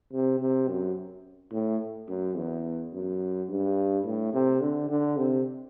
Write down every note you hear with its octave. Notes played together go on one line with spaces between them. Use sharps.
C3
C3
F#2
A2
F#2
E2
F#2
G2
A2
C3
D3
D3
C3